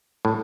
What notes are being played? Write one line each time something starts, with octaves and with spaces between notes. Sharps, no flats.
A2